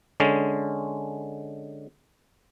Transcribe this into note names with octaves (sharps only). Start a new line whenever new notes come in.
D3 G#3 C#4